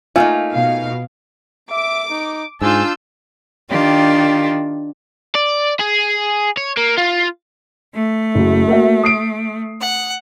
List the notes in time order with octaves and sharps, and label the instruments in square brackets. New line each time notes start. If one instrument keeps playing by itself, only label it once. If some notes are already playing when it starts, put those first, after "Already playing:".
[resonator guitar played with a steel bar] A3 A#3 D#4 [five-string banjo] F4 [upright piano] G#5
[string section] B2 F5
[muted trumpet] E5 [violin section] D6
[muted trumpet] D#4
[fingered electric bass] G#2 [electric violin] D4 F4 [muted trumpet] G#5 [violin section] A5 E6 G6
[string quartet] D#3 F4 G4 [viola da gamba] D4
[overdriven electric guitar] D5
G#4
C#5
A#3
F4
[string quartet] A3
[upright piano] F#1 F#3
A#3 F#4 E5
D#6 C7 D7
[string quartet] F#5